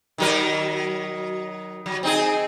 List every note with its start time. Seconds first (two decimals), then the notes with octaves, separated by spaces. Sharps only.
0.18 D#3 F#3 A#4
1.86 F#3
2.03 C4 D#4 G#4